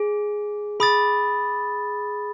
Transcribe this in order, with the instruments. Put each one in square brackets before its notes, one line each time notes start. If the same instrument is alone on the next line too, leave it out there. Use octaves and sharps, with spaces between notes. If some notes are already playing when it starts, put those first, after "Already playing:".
Already playing: [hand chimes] G#4
[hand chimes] G#4 [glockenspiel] B5 D#6 A6